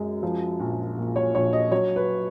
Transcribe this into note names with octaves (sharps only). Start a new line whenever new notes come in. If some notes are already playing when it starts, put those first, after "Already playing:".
Already playing: F#2 G#3
F3
A#1
A#2
C#5
A#1 C#5
D#5
F#3 C#5
B4